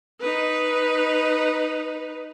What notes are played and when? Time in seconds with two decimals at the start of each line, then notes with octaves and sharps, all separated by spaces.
0.21 D#4 B4